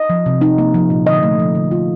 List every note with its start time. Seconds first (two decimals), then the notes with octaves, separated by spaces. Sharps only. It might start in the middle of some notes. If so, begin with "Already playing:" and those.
Already playing: D#5
0.10 F3
0.26 C3
0.41 D#4
0.58 A#3
0.74 F3
0.90 A#2
1.06 D3 D#5
1.23 A3
1.39 F3
1.55 D3
1.71 F4